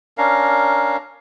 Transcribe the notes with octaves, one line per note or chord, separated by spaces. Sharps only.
C#4 D4 A#4 F5